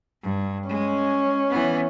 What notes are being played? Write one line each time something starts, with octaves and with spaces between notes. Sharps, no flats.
G2
G#3 C#4
E3 B3